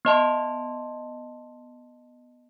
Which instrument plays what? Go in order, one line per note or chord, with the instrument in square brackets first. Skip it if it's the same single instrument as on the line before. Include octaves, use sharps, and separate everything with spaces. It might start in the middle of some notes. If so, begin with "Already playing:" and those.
[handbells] B3 D#5 A5 C6